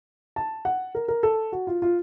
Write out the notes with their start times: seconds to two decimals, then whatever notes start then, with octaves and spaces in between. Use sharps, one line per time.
0.36 A5
0.65 F#5
0.95 A#4
1.08 A#4
1.23 A4
1.52 F#4
1.67 F4
1.82 F4